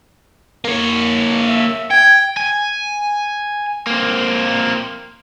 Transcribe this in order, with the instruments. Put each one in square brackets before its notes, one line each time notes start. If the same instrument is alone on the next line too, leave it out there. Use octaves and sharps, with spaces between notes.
[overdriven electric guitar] A#3 C#5
[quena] E5
[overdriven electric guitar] G5 [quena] G#6
[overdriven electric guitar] G#5
A#3 C4